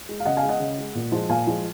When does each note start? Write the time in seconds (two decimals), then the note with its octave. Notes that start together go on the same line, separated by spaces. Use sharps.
0.09 G#3
0.20 F5
0.25 C#3 D#5 F#5
0.37 F5 G#5
0.43 G#3
0.49 D#5 F#5
0.60 C#3
0.78 G#3
0.95 A#2
1.12 F3 G#3
1.29 A#2 F5 G#5
1.47 F3 G#3